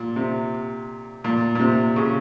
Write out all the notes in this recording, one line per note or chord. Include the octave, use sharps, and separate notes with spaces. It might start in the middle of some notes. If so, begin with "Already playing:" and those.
Already playing: A#2
C3
A#2
A#2
C3
C#3